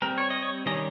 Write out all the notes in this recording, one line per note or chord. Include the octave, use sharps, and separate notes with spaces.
G3 C4 A#4
C#5
D#5
C#5
D#3 G3 C#4 D#5